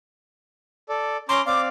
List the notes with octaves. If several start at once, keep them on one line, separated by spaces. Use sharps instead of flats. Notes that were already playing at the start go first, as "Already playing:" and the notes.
A4 D5
C#4 A#5 C6 D6
C4 D5 F5 D6